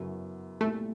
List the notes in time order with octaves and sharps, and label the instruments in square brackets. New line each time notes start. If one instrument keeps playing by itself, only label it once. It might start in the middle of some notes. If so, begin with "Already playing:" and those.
Already playing: [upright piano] F#2 C#3 F#3 B3 E4
[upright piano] C2 A#2 G3 [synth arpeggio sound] A3